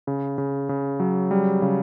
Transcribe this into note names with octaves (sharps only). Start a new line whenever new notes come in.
C#3
C#3
C#3
F#3
G3
C#3